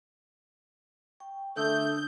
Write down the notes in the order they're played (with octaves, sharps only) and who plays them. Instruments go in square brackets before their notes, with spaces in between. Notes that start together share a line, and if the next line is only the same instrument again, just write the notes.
[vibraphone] G5 C#6
[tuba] D3 [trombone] A3 [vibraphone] D4 D#6 E6 [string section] G6